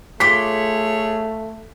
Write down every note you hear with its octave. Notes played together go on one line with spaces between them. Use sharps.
A3 F4 G#4 C#5 C6 D6 B6